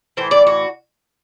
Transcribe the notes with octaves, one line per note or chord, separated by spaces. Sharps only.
A2 E3 C5
D5
F#4